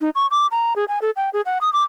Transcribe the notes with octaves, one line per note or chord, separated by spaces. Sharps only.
D#4
C#6
D6
A#5
G#4
G#5
A4
G5
G#4
F#5
D#6
D6